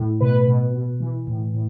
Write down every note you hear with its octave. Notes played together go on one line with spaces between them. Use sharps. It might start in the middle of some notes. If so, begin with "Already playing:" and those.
Already playing: A2
B2 B4
B2
B2
E3
A2
A2